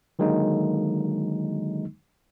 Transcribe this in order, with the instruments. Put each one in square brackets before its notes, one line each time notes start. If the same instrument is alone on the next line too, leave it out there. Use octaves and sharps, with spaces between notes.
[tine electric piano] D3 D#3 F#3 G#3 A#3 D#4